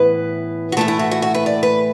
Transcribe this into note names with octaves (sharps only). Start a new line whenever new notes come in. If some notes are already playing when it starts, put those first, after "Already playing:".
Already playing: A2 E3 B3 B4
F#4
A2 E3 A3 A4
E4
F#4
F#4
F#4
B4
D5
B4